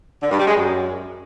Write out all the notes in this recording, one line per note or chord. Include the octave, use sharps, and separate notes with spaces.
D3
G2
G3
G#3
F#2